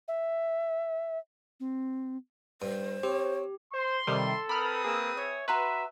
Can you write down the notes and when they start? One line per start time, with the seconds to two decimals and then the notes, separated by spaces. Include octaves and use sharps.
0.08 E5
1.60 C4
2.62 G2 C5
3.03 C4 G4 C#5
3.73 C5 C6
4.07 C3 D#3 G3 A4
4.49 C4 A#4 B4 B5 D#6 F6
4.84 A#3 G#4 E6
5.17 C#5 E5
5.48 F#4 B4 E5 A#5 C6